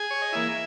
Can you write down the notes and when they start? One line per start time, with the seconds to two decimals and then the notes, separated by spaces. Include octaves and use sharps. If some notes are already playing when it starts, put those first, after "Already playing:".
Already playing: G#4 G#5
0.11 C#5
0.22 D#5
0.32 E3 A#3 E4 E5